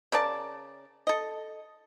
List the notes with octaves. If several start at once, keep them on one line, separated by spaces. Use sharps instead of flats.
C#3 A#4 D5 A5
A4 D#5